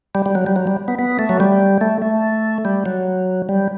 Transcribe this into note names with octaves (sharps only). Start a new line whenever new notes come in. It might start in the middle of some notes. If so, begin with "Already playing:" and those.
G3
G3
F#3
G3
F#3
G3
B3
B3
A3
F#3
G3
A3
A3
G3
F#3
G3